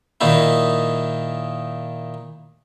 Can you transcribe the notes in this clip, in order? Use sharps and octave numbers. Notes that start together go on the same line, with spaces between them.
A#2 D#3 D#4 E4